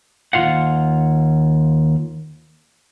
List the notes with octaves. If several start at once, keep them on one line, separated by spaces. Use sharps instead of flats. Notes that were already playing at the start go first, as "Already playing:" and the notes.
D#2 D#3 F4 F5 F#5